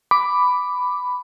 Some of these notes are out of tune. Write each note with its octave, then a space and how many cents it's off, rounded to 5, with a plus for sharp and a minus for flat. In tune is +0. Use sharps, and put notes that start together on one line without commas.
B5 +10 D6 +0